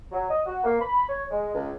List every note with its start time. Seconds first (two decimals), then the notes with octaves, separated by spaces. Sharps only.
0.12 F#3
0.29 D#5
0.46 F#4
0.64 A#3
0.79 B5
1.09 C#5
1.31 G#3
1.55 C#2